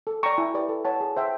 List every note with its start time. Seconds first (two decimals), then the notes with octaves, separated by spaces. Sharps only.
0.07 A4
0.23 D5 G5 A#5 C#6
0.38 E4
0.54 G4 B4 D5
0.69 A4
0.85 C#5 F#5 A5
1.01 G#4
1.16 C5 E5 G5